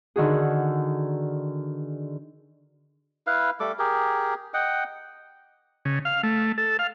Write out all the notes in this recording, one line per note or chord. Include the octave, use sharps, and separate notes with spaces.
D3 D#3 F#4 G#4
E4 B4 F5
G3 A3 A4 D6
G4 G#4 A#4
D#5 F#5 G5
C#3
F5
A3
A4
F5